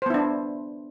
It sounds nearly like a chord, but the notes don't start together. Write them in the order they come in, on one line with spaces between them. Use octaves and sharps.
C5 B3 E4 D4